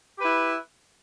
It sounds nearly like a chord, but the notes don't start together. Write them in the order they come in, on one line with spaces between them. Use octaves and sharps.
G4 B4 E4